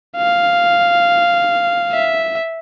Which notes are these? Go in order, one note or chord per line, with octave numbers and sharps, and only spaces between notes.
F5
E5